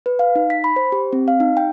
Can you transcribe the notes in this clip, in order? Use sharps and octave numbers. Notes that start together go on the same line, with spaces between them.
B4
F5
D#4
B6
B5
C5
G4
C4
F5
D#4
G5